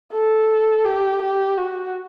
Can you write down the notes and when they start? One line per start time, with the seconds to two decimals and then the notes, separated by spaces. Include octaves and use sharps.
0.13 A4
0.85 G4
1.21 G4
1.58 F#4